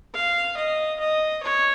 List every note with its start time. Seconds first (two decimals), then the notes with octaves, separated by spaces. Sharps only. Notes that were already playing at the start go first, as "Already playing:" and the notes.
0.14 F5
0.57 D#5
1.00 D#5
1.43 C#5